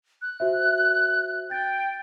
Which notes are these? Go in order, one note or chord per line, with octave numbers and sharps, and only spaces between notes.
F#6
F#4 C5 E5
G5 G6 A6